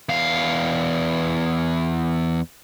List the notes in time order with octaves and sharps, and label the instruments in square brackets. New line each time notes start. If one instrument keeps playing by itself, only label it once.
[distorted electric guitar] E2 F5